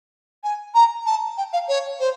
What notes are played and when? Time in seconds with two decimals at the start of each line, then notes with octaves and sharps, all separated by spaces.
0.43 G#5
0.74 A#5
1.06 A5
1.37 G5
1.53 F5
1.68 C#5
2.00 C5